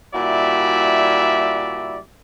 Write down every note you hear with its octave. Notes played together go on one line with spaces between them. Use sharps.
A#2 G3 E4 F#4 D5 E5